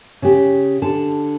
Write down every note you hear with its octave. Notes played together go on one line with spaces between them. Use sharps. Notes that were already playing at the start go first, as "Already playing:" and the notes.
C#3 G4
D3 A5